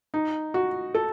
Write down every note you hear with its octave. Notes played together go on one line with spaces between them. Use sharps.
D#4
F#4
A4